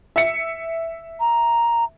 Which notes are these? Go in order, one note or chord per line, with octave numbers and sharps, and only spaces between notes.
E5 C#7
A#5